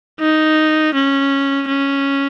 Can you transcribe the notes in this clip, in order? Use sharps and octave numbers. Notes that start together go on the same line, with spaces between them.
D#4
C#4
C#4